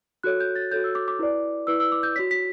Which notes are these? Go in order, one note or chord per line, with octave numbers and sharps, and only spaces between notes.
F#4 A4 C#5 F#6
G6
A6
F#4 A4 C#5 G6
E6
D6
D6
E4 B4 D5
E4 B4 D5 E6
E6
D6
G6
F#4 C#5 B6
B6